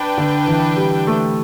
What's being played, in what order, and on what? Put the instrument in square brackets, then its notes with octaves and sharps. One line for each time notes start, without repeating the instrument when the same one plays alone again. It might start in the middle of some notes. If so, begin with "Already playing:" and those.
Already playing: [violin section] D4 B4 G5
[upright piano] D3
E3
G3
A3